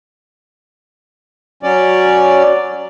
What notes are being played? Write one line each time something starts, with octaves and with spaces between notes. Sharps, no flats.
F#3 C#4 D5